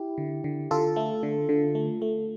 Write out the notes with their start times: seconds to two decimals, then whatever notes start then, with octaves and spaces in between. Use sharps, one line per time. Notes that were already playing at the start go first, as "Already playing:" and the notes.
Already playing: E4 G4
0.18 D3
0.44 D3
0.71 D3 F4 A4
0.96 A3
1.23 D3
1.49 D3
1.75 A3
2.02 A3